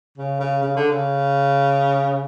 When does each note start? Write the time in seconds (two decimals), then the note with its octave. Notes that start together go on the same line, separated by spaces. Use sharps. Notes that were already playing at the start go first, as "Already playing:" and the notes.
0.18 C#3
0.40 C#3
0.63 C#3
0.76 D3
0.90 C#3